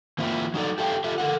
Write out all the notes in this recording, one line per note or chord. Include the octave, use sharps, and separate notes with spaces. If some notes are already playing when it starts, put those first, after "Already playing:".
E3 A#3 C4 E4 F4
F#3 D#4 E4 A4 D5
G4 A4 E5 F5 G5
F4 G4 A4 E5
A4 A#4 F#5